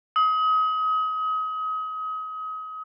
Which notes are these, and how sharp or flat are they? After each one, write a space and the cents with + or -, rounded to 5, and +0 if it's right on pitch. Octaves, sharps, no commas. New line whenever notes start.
D#6 +35